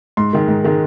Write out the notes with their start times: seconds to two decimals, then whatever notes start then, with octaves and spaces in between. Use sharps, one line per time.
0.17 G#2 C6
0.33 D#3 G#3
0.48 G#2
0.64 D#3 G#3